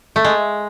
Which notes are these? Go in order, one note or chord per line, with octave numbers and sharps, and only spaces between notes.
A3
G#3